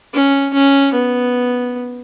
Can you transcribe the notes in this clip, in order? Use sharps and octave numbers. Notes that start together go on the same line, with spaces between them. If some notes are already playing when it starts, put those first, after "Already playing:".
C#4
C#4
B3